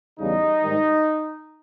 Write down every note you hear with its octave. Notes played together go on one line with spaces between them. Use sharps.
E2 C#3 G3 D#4
G#2 D#3 G3